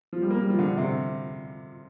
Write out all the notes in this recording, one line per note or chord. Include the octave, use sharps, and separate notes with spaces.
F3
G3
A#3
G3
F3
D3
C3